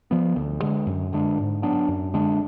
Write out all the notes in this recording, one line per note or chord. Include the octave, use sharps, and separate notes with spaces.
F3 B3
D2
D3 G#3
F#2
D3 G#3 D4
G#2
F#3 B3 D4
F#2
D3 G#3 D4